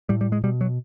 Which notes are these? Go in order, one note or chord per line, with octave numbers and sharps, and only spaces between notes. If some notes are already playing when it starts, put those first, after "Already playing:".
A2 G3
G3
G#3
B2 G3
F#3